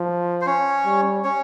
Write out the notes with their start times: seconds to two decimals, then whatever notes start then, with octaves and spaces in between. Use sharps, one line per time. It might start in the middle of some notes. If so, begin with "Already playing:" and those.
Already playing: F3
0.41 C5
0.46 C#4 C#5
0.85 G3
1.24 C#4 C#5